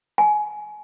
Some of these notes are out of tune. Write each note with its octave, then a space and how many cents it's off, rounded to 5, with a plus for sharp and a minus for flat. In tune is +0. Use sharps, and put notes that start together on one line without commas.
G#5 +20